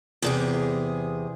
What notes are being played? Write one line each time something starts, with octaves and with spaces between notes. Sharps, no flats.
E2 C3 G#4